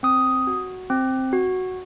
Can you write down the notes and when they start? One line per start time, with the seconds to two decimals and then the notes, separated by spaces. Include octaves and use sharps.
0.03 C4 D#6
0.47 F#4
0.90 C4
1.33 F#4